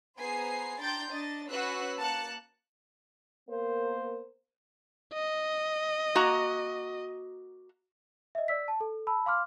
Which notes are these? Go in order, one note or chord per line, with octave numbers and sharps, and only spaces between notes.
B3 G#4 C5 G#5 A#5 C7
D4 G5 A#5 C6 G6 A6
D4 D#5 A6
C#4 F#4 B4 E6 F#6 C7
A#3 A5 F#6 C#7
A#3 B3 A#4 C5
D#5
A#3 F#4 A#5
D#5 E5
D5 E6 B6
A5
A4
A5 B5 E6
F5 C6 D6 F6